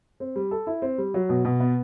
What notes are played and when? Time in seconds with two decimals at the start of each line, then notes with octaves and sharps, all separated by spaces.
0.20 C4
0.36 G3
0.51 A4
0.67 E4
0.82 C4
0.98 G3
1.14 F#3
1.29 B2
1.45 B2
1.60 B3